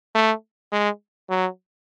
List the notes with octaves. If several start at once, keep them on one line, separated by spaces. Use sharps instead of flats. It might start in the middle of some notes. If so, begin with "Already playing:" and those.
A3
G#3
F#3